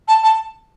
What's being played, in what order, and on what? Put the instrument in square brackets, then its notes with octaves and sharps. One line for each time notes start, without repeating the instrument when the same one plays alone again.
[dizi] A5
A5